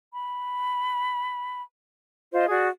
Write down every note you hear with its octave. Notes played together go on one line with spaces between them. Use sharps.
B5
F4 C5 D#5
F#4 G#4 D5